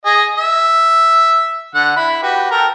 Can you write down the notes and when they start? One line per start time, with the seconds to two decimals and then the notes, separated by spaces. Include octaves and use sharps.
0.05 G#4 D#5
0.37 E5
1.75 D3 F#5
1.96 E4 B5
2.23 F#4 G4 B4
2.51 A4 A#4 G5